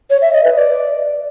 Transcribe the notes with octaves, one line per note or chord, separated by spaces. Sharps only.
C#5
E5
D#5
B4
D5